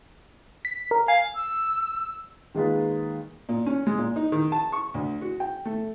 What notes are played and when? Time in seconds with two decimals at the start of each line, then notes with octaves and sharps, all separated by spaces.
0.65 B6
0.91 A#4
1.08 F5 G#5
1.35 E6
2.55 D#3 G#3 A#3 F4 G#4 B4
3.49 A#2
3.66 C#4
3.87 G#3
3.98 A#2
4.16 D#4
4.32 D#3
4.52 A5
4.72 C#6
4.94 D2
5.21 F#4
5.40 G5
5.65 A3